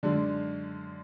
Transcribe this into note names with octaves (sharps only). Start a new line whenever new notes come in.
F#2 D3 G#3 D4